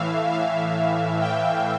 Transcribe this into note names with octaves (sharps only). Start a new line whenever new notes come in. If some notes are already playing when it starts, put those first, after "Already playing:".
Already playing: A2 E3 E5 F5
F5
G5